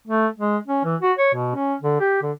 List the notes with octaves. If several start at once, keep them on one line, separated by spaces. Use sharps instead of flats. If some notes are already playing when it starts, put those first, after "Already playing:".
A3
G#3
C#4
E3
F#4
C#5
B2
C#4
D3
G4
D3